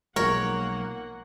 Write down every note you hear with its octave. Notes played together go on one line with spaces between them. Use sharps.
B1 F3 G#3 A#3 A#4 C#5 F#5